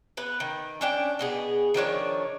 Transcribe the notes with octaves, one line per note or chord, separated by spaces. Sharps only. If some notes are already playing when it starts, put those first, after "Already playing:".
B3 B4
D#3
C#4 D4 G5
B2 B3 G#4
D#3 F3 D4 C#5